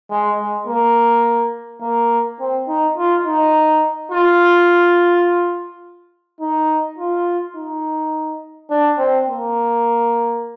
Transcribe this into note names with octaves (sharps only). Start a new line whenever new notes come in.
G#3
G#3
A#3
A#3
C4
D#4
F4
D#4
F4
D#4
F4
D#4
D4
C4
A#3